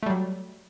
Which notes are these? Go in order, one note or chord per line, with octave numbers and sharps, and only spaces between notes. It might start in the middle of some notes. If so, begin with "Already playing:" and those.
F#3 G3 A3